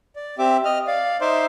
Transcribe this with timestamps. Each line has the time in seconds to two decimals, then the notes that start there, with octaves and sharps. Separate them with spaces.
0.16 D5
0.38 C4 G4 E5 D6
0.65 D#5 F6
0.87 D5 F5
1.21 D#4 C5 E5 C6 D6